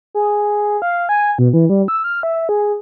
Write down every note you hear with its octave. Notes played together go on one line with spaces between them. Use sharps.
G#4
F5
G#5
B2
E3
G3
E6
F6
E5
G#4